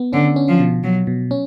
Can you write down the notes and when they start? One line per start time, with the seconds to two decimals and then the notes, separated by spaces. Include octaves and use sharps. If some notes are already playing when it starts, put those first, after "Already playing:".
Already playing: B3
0.13 D3 C#4
0.36 C#4
0.48 F3
0.60 B2
0.84 B2 F#3
1.07 B2
1.31 C#4